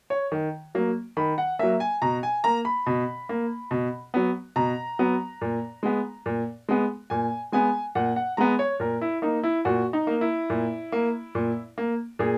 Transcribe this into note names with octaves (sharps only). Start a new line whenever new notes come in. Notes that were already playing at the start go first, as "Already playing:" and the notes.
C#5
D#3
F#3 A#3
D#3 B5
F#5
F#3 A#3 E5
G#5
B2 A#5
G#5
A#3 A#5
B5
B2
A#3
B2
F#3 B3
B2 A#5
F#3 B3
A#2
G#3 B3
A#2
G#3 B3
A#2 G#5
G#3 B3 G#5
A#2 F#5
F#5
G#3 B3 A#5
C#5
A#2 A#4
E4
A#3 D#4
E4
A#2 F#4
D#4
A#3
E4
A#2
A#3
A#2
A#3
A#2 G#4